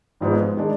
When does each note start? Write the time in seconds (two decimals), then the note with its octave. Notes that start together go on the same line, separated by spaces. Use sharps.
0.21 G#1 G#2 F3 G#3 B3
0.57 D#3 G#3 D4